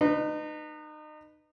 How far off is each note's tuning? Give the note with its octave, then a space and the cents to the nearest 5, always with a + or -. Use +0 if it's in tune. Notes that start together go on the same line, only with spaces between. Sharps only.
D#4 -30 B4 +0